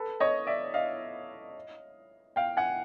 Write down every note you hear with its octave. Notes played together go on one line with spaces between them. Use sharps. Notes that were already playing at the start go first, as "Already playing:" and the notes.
Already playing: A4 B4
C#5 D#5
D5 E5
D#5 F5
F5 G5
F#5 G#5